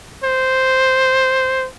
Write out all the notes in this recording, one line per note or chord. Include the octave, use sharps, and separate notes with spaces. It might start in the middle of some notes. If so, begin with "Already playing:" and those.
C5